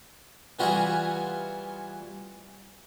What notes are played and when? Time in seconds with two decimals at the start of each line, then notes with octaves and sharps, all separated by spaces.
0.59 E3 G3 B3 F4 F#4 G#4